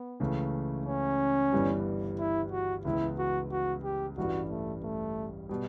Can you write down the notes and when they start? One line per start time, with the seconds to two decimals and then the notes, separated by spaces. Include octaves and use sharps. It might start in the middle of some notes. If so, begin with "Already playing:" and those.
Already playing: B3
0.20 C#2 C#3 E3 A3
0.86 C#4
1.53 G1 G2 E3 G3
2.19 E4
2.52 F#4
2.85 C#2 C#3 E3 B3 E4
3.19 F#4
3.51 F#4
3.84 G4
4.17 A1 G2 E3 G3 F#4
4.50 A3
4.83 A3
5.49 B2 G3